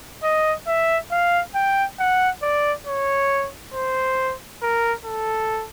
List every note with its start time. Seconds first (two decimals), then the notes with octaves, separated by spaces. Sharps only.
0.23 D#5
0.67 E5
1.11 F5
1.55 G5
1.99 F#5
2.42 D5
2.87 C#5
3.74 C5
4.62 A#4
5.05 A4